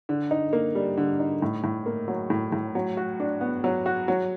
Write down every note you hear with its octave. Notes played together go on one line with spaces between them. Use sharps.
D3
D#4
A#3
G3
D3
D#4
A2
A2
A#3
F#3
A2
A2
F#3
F#4
D4
B3
F#3
F#4
F#3